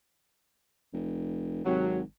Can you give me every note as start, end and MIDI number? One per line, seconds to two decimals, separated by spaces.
0.93 1.60 29
1.65 2.03 32
1.65 1.99 48
1.65 1.99 54